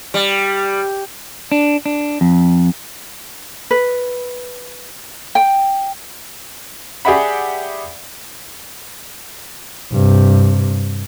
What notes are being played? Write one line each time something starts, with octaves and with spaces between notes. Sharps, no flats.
G3
D4
D4
F2
B4
G5
G4 G#4 D5 E5 F#5 B5
G2 C3